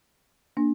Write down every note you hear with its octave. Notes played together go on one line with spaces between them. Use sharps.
A#3 D4